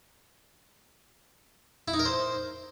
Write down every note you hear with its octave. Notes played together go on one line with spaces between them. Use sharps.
E4
D#4
A#4
C5